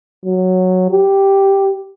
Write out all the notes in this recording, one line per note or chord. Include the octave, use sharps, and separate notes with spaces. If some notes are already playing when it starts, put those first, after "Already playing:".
F#3
G4